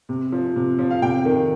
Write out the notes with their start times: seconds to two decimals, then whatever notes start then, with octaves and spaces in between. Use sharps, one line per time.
0.09 C3
0.32 F3
0.56 C3
0.79 F3
0.91 F5
1.02 C3 G5
1.25 D#3